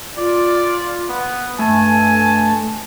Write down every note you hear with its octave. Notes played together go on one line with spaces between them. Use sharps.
F4 D5
B3
G2 A3 G#5 A5